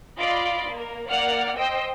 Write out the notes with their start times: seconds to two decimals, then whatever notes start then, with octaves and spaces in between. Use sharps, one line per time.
0.19 F4 D5 D#5 B5 C6 D6
0.71 A#3 A#4
1.09 A#3 D5 F#5 F6
1.57 C5 D#5 G5 E6